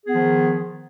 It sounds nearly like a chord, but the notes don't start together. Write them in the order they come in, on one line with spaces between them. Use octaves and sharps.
G#4 B3 D#3 F3